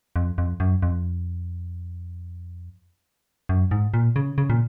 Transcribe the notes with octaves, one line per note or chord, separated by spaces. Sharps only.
F2
F2
F#2
F2
F#2
G#2
A#2
C#3
C#3
A#2